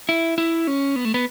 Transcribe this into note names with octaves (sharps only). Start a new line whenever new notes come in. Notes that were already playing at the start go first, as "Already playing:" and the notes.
E4
E4
C#4
B3
A3
B3